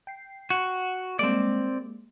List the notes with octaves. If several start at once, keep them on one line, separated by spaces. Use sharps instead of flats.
G5 C7
F#4
G3 G#3 A#3 C4 D5